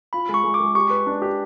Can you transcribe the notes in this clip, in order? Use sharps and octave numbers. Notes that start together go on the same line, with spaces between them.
F4 B5
G#3
C#6
G#3
D6
G#3
G4 C#6
B4
D4
G4